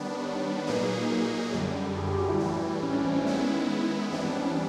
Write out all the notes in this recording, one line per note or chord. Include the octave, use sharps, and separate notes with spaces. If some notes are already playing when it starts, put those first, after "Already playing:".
Already playing: D#3 G3 B3 D4 B4
C#5
A#2 F#3 A#3 D#4 G#4 B4
A#4
F#2 D3 G3
G#4
G4
F#4
E4
A2 E3 G3
C#4
D4
C4
C#4
D#3 G#3 B3 E4
E3 G3 B3 C4 D4
C4
C#4
C#4